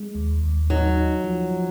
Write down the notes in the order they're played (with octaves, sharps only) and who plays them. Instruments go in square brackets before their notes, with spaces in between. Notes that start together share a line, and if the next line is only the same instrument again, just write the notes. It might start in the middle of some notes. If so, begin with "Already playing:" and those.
Already playing: [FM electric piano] G#3
D#2
D#2
[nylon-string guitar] F#3 [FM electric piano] D#4
[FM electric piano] D#4
F3
F3